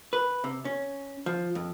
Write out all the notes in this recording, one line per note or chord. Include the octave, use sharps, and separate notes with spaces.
B4
C3
C#4
F3
F2